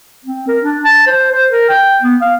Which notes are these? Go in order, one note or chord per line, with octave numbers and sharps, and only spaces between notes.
C4
A#4
D4
A5
C5
C5
A#4
G5
B3
F5